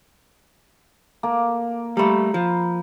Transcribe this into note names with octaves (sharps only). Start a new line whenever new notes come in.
A#3 A5
G3 A3 A#4 B5
F3